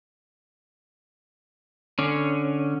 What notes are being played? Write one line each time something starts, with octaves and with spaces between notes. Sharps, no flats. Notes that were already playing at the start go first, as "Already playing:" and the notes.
D3 C#4